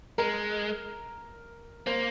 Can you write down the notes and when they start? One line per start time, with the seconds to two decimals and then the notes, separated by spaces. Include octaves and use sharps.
0.18 G#3 A#4
1.87 A#3 C5